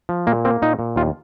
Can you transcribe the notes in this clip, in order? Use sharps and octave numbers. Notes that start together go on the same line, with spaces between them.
F3
A#2 A#3
A#3 C4
A#2 D#4
A#2
D#2 F4